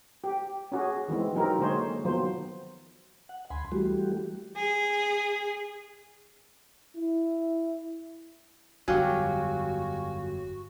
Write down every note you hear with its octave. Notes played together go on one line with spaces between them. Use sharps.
G4
C#4 F#4 G#4
D#3 E3 G#3 C4
F#3 C4 D#4 G4 A#4
D3 G#3 A#3 G#4 C5 C#5
D#3 F3 F#3 B3 C5
F#5
D2 G#5 B5 C6
E3 G3 A3 F#4 G4
G#4
E4
G1 F2 F#3 F#4 G4 F5 G#5